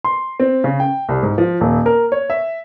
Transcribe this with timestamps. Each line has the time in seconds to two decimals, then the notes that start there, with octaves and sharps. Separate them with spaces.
0.04 C6
0.40 C4
0.64 C#3
0.80 G5
1.09 C2
1.23 G#2
1.38 F3
1.60 D#1
1.86 A#4
2.12 C#5
2.30 E5